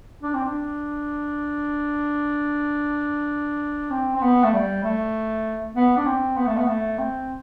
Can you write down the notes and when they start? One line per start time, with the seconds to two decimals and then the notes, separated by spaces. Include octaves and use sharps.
0.23 D4
0.34 C4
0.45 D4
3.91 C4
4.16 C4
4.22 B3
4.44 A3
4.53 G3
4.84 A3
5.75 B3
5.97 D4
6.06 C4
6.37 B3
6.47 A3
6.57 B3
6.68 A3
6.98 C4